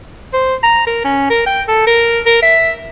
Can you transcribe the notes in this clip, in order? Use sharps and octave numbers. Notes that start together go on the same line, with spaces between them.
C5
A#5
A#4
C#4
A#4
G5
A4
A#4
A#4
E5